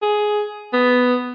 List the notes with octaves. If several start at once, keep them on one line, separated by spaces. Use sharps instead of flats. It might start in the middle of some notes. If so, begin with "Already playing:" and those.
G#4
B3